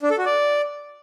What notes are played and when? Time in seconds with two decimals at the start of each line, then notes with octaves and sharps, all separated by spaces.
0.02 D4
0.10 A4
0.18 F#4
0.26 D5